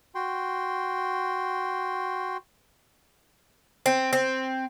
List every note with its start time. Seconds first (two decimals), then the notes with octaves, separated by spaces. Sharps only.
0.15 F#4 G5 C6
3.86 C4
4.13 C4